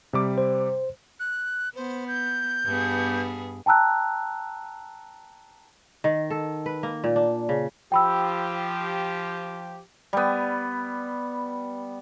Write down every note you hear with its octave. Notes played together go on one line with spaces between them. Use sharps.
C3 G3 D6
C5
F#6
B3 C5
G6
G2 B3 G#4
G5 A5 A#5 E6 F#6
D#3
A4
B4
A#3
A#2
D4
C#3
F3 G4 G5 B5 E6
G3 B3